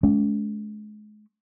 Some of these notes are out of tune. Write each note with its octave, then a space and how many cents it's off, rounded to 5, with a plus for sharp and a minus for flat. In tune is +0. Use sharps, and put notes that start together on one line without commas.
G#3 +35 C#4 +40